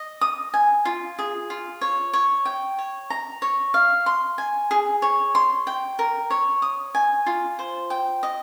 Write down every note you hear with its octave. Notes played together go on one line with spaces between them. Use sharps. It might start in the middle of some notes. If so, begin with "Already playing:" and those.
Already playing: D#5
D#6
G#5
F4
G#4
F4
C#5
C#5
G5
C#5
A#5
C#5
F5
C6
G#5
G#4
C#5
C6
G5
A#4
C#5
D#6
G#5
F4
C5
G5
D#5